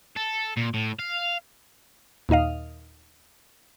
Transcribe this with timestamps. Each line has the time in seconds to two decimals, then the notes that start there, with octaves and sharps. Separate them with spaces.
0.17 A4
0.57 A#2
0.74 A2
0.99 F5
2.29 D#2 A#2 D#4 D#5 F5